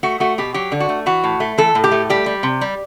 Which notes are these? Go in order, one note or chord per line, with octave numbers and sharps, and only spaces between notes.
A3 F#4
A3 F#4
B2 G4
F#3 G4
D3
F#4
A3
E3 F#4
A2
A3
E3 A4
A2
G4
A3
G3 G4
G3
C3
G3